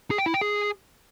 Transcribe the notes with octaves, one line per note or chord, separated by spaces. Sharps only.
G#4
G5
E4
G5
G#4